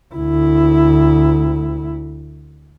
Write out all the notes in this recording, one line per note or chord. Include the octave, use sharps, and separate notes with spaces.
D2 E4